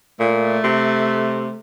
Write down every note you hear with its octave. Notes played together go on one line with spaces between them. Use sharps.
A#2 A3
C3